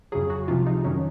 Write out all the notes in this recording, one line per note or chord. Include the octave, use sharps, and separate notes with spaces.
F2 C#3 F#3 G#4
F#4
C#2 C3 F3 F4
D#4
F2 D#3 F#3 C#4